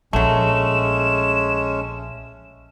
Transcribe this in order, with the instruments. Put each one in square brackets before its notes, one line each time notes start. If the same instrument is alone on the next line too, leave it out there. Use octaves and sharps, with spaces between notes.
[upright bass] A#1 [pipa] F#3 A3 [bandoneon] G#3 C#4 [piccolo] E7